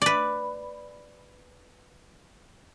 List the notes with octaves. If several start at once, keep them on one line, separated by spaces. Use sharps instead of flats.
B4 D5